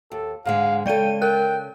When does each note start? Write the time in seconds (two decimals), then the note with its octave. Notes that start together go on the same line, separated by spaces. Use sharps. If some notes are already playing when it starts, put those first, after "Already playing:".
0.12 D#2 A4
0.45 G#2 D3 G#3 F5
0.86 C#3 G#3 A4 D5 G5 D#7
1.22 A#4 G5 F#6